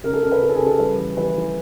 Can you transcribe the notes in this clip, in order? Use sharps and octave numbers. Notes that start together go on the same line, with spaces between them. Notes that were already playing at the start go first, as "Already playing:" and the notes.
C#3 A#4
A4
C#3 A#4
B4
C#3 A#4
A4
G#4
C#3
A4
G3 B4
E3
E3 B4
E3